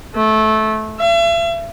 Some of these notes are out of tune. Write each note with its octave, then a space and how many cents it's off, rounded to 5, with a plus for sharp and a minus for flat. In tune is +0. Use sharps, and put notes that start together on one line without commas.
A3 -15
E5 +40